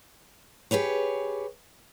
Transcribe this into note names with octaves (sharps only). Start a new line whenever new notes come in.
G4 G#4 B4 C#5